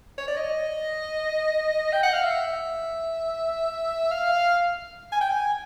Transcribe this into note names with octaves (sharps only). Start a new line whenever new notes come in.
C#5
D5
D#5
G5
F#5
F5
E5
F5
G#5
G5
G#5